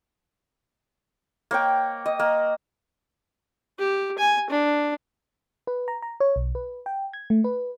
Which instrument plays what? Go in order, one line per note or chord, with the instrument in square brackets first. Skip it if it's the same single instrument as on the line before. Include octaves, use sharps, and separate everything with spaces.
[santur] A#3 C#5 G5
D#5
A#3
[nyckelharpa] G4
G#5
D4
[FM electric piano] B4
A#5
A#5
C#5
B1
B4
G5
G#6
A3
B4